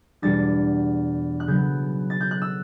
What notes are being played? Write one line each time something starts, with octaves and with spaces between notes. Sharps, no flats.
E2 B2 G3 D4 A6
F#6
C#3 F#3 B3 G6
A6
G6
F#6
E6